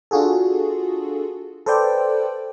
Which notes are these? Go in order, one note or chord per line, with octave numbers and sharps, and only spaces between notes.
D4 F4 F#4 G#4 A4
A4 B4 C5 D5 G5